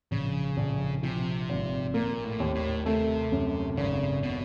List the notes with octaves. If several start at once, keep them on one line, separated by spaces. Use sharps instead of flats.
A#1 C#3
A#1
C3 F3
G#1
A#2 A#3
A2
D#2
A2
C3 A3
F#2
G#1 C#3
B2